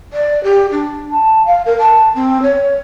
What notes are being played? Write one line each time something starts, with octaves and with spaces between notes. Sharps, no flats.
D5
G4
D4
A5
F5
A#4
A5
C4
C#5